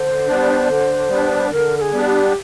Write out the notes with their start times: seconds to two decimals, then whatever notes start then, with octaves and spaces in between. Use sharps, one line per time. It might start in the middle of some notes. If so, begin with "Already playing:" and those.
Already playing: D3 C5
0.28 G3 B3 D4
0.68 D3
1.09 G3 B3 D4
1.51 D3 A#4
1.78 A#4
1.81 G#4
1.92 G3 B3 D4
2.05 G4